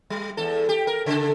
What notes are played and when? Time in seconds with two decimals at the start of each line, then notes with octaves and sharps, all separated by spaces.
0.10 G3
0.37 E2 A4
0.69 G4
0.87 A#4
1.06 C#3 A4